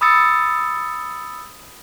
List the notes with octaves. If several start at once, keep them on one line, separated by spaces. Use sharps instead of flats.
B5 D#6 E6 A6 C#7